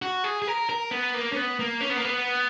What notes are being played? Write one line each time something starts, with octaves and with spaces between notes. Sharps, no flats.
F#4
G#4
G#4
A#4
A#4
B3
A#3
C#4
B3
A#3
C#4
B3
A#3
B3